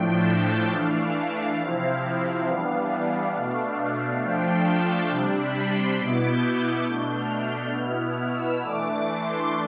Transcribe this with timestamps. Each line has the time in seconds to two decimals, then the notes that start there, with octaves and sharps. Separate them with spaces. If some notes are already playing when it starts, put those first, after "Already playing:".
Already playing: A2 F3 A3 D4 G5
0.14 A5
0.72 E3 A3 D4 F5
1.60 C3 F3 C4 E4
2.48 E3 G3 B3 D4
3.36 B2 A3 D4
4.24 F3 A3 D4 G5
4.53 A5
4.81 G5
5.11 C3 G3 D4
5.41 B5
5.70 C6
5.99 B2 B3 E4 D6
6.28 G6
6.58 G6
6.86 B2 A3 D4 G6
7.17 F6
7.46 F6
7.75 B2 B3 E4 F6
8.03 F6
8.33 E6
8.63 E3 A3 D4 D6
8.91 D6
9.21 C6